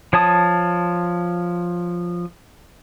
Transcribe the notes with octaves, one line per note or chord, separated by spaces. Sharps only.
F3 C#5 A5 D#6